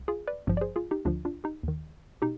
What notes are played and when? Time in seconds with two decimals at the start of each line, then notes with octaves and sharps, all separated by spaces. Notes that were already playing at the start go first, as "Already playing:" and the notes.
Already playing: C2
0.08 F4 G#4
0.28 B4 D5
0.47 G#1 G2 F3
0.57 D5
0.61 G#4 C5
0.76 F4 G#4
0.91 D#4 G4
1.05 D2 D3 F3 D4 F4
1.25 D4 F4
1.44 D#4 G4
1.63 D#2 D#3
2.22 B2 D#4 G4